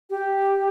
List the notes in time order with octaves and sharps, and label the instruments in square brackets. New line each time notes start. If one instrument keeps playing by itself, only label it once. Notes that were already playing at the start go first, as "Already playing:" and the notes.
[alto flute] G4